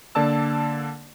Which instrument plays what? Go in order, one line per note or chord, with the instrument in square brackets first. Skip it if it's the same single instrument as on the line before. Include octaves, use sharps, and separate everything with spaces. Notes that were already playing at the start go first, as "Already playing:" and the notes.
[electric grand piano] D3 A#3 D5 A5 E6